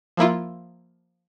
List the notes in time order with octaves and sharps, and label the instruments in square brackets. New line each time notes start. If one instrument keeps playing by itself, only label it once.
[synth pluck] F3 A#3 E4 F4